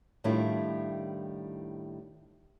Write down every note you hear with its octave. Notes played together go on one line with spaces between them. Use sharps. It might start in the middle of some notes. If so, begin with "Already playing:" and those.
A2 D#3 G3 D4 E4 F4